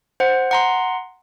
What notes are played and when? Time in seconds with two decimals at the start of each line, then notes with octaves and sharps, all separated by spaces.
0.20 C5 F#5
0.51 F#5 A#5 C6